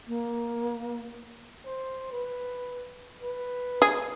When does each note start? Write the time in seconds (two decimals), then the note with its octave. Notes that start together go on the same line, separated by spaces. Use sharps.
0.08 A#3
1.66 C5
2.12 B4
3.23 B4
3.82 G#4